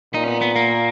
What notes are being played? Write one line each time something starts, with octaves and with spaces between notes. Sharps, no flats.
A#2 D#4
C#4
B3
B3
A#3